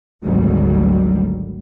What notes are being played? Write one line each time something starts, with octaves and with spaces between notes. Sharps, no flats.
G#1 D2 F#3 G3